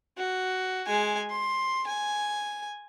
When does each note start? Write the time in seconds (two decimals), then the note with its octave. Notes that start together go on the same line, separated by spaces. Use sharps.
0.18 F#4
0.86 G#3 G#5
1.30 C6
1.87 G#5